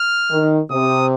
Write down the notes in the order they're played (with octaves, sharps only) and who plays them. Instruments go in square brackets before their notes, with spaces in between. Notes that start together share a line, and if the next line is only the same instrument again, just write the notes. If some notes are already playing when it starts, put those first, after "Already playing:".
Already playing: [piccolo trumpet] F6
[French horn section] D#3
[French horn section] C3 [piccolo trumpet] D#6